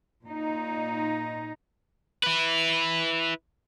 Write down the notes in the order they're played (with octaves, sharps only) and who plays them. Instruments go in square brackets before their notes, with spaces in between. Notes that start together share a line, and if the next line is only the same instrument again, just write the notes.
[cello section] A#2 D#4
[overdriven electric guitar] E4 B4